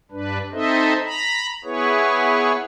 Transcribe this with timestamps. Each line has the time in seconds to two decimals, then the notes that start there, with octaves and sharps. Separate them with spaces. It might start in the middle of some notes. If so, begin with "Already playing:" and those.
0.11 G2 D4 B4
0.52 C4 D#4 A4 C5 D#5 E5
1.05 A#5 B5
1.64 B3 E4 G#4 B4 C#5